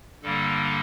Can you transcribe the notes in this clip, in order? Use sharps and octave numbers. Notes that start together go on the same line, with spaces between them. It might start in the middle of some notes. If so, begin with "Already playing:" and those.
G2 D3 G3 A#3 A4